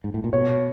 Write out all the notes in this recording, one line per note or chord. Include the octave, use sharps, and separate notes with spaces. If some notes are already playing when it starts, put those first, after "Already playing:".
G#2
A2
A#2
B2 C#5